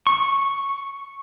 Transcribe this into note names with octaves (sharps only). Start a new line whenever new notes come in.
C#6